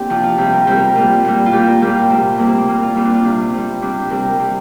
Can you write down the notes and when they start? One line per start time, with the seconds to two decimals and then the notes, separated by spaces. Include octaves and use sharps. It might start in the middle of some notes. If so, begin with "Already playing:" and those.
Already playing: A#3 C4 D4 G4
0.10 C3 F3
0.23 F4
0.38 C3 G3 G4
0.53 A#4
0.67 C3 G3 G4
0.76 A#4
0.95 A#2 G3 F4
1.25 A#2 G3
1.46 F4
1.52 A#2 G3 G4
1.67 A#4
1.81 A#2 G3 G4
1.90 F4
2.09 C3 G3 C4
2.38 C3 G3 A#3
2.49 C4
2.58 A#3
2.68 A#2 G3
2.82 F4
2.96 A#2 G3 C4
3.05 D4
3.14 F4
3.25 C3 G3
3.53 C3 G3
3.82 C3 G3 D4
4.02 G4
4.10 C3 G3 A#4
4.39 C3 G3